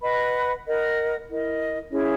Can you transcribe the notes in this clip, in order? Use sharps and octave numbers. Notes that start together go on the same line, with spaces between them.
B4 D#5 F#5 B5
A#4 D#5 F#5
E4 A#4 D#5
C#4 E4 G#4 C#5